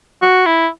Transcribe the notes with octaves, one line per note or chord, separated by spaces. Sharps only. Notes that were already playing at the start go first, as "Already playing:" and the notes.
F#4
E4